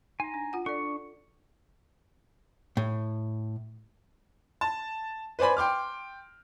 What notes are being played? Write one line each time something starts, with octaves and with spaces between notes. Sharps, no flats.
D#4 G#5 A#5
D4
F4 F#5
D4 A4 D5 C#6
A2
A5
B4 C5 D5 G#5 B5
G5 C6 D6 F6